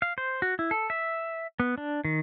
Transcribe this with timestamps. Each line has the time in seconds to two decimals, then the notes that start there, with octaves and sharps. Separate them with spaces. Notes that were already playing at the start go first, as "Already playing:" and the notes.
0.02 F5
0.18 C5
0.42 F#4
0.59 E4
0.71 A4
0.90 E5
1.60 B3
1.78 D4
2.05 D#3